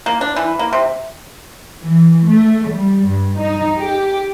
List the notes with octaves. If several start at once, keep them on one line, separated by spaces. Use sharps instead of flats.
A#3
D4
E3
A#3
C3
E3
A3
G3
G2
D#4
G4